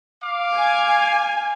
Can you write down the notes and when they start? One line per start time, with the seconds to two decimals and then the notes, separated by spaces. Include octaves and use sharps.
0.23 F5 D6
0.55 G#5